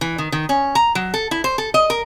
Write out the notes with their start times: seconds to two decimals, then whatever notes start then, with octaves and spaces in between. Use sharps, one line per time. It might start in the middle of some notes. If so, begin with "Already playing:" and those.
0.01 E3
0.18 D#3
0.32 D#3
0.49 C#4
0.75 A#5
0.95 F#3
1.14 A4
1.31 E4
1.44 C5
1.58 A4
1.74 D#5
1.90 A#4